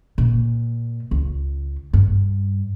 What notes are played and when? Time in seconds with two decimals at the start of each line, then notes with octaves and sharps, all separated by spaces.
0.18 A#2
1.11 C#2
1.93 G2